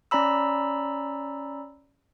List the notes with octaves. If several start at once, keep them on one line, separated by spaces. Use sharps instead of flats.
C#4 D5 A#5 B5 E6